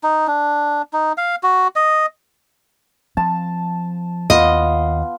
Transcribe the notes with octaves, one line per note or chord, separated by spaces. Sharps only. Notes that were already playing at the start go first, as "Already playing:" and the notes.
D#4
D4
D#4
F5
F#4
D#5
F3 C4 A5
D#2 B3 F4 D#5